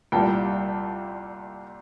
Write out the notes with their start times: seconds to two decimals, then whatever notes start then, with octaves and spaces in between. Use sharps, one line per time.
0.12 C2 A#2 G3 G5 A5